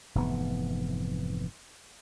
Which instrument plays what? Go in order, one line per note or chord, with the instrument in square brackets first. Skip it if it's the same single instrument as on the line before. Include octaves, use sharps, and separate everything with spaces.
[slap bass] F1 G#2 E3 B3